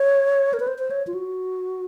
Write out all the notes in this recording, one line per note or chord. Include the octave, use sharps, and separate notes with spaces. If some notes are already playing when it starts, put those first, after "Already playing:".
Already playing: C#5
A#4
B4
C5
C5
C#5
F4
F#4